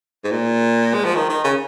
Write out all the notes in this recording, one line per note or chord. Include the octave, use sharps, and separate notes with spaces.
G#2
A#2
G#3
F3
D#3
D#3
C#3